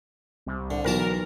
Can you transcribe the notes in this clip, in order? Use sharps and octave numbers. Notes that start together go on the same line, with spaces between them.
C2
D3
B1 E3 A#4 A5